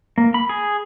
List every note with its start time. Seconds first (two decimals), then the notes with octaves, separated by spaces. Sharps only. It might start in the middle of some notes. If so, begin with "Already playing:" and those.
0.18 A#3
0.34 B5
0.49 G#4